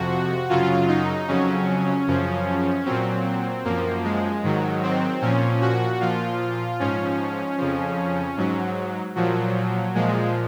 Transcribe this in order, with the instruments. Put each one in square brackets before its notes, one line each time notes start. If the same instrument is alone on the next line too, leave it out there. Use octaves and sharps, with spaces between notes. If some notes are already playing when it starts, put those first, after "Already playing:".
Already playing: [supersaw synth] F2 C3 F3 F#4
F#2 C#3 F#3 F4
D#4
F2 C#3 F#3 C#4
F#2 C#3 F3
A#2 F#3 C4
F#2 F3 A#3
G#3
G#2 D#3 F#3
C4
A#2 F3 C#4
F#4
A#2 F3 F4
G#2 F3 C#4
F2 C#3 F3
G#2 F#3
A#2 F3 F#3
A#2 F3 G#3